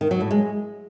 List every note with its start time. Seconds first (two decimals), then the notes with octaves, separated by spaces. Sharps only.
0.01 D#3
0.11 F#3
0.21 A2
0.31 G#3